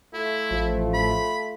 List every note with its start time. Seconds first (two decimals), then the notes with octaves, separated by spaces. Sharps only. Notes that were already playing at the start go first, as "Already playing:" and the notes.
0.14 A3 E4 F4
0.51 A1 F3
0.94 B5